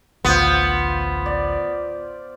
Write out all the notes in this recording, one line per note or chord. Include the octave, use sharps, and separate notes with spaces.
A1 D2 B3 F4 C5
D5